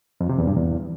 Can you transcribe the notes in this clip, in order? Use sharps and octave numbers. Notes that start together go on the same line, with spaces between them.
F2
C3
E2
G2
E2